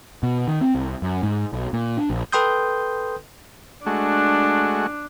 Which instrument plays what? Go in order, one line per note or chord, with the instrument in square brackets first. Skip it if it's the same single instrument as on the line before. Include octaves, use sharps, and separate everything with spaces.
[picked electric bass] B2
D#3
C4
C2
F#2
G#2
B1
A#2
D4
A#1
[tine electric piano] A4 B4 G5 C6 D#6 G6
[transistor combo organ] G#3 A3 F#4 [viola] D4